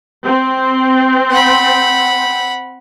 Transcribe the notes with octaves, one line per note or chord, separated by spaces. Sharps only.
C4
F#5 B5